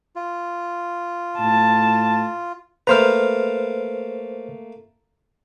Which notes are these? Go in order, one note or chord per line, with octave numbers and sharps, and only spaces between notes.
F4
A2 A5
A3 A#3 B4 C5 A#5 F6